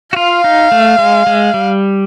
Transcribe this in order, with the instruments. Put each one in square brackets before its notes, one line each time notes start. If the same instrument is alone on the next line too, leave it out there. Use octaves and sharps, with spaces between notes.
[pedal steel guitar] F#4
[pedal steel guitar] F4 [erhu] F5
[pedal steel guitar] D#4
A3
G#3
G#3
G3